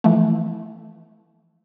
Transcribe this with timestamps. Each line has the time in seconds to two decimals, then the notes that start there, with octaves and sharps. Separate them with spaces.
0.04 E3 F3 A3